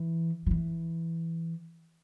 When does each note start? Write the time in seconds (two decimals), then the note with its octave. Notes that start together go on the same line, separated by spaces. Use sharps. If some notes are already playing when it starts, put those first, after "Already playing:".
Already playing: E3
0.46 F3
0.51 E3